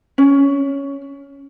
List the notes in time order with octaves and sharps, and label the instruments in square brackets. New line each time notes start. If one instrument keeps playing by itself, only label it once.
[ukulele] C#4